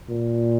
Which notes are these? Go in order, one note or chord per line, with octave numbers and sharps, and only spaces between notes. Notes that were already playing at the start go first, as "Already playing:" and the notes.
A#2